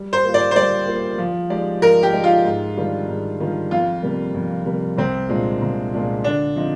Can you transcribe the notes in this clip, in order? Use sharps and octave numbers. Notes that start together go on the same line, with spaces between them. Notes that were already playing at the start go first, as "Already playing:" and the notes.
Already playing: G3
C5
A#3 F4
D5
C5
G3 D5
A#3 F4
F3
G#3 D#4 G4 D5
F3 A#4
G4
G#3 D#4 G4 D5
F4
G#2
D#3 G3 D4 F4
G#2
D#3 G3 D4 F4
F2 F4
C3 G3 A#3
F2
C3 G3 A#3
C2 C4
A#2 G#3 D4 F4
C2
A#2 G#3 D4 F4
D3 D4
F3 C4 D#4